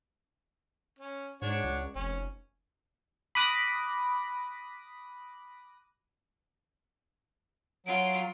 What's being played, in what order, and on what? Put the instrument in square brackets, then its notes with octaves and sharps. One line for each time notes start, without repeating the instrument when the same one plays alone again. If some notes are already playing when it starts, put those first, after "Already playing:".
[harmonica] C#4
[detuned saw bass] G#2 [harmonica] D4 F#4 C#5
[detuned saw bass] C#2
[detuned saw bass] F1 [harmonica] C#4
[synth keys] B5 D6 D#6 F#6 A#6 B6
[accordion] F#3 [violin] F4 D7